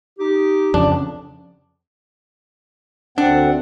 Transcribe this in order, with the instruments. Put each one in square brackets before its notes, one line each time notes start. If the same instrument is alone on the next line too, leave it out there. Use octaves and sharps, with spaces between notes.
[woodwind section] D#4 G4
[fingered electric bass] F2 C#3 [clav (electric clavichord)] D4
[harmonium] D2 C4 F#5 [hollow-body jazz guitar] D4